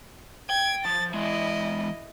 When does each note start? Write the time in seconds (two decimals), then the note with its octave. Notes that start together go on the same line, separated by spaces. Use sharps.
0.50 G5 G#6
0.85 F3 A6
1.14 E3 G#3 E4 D#5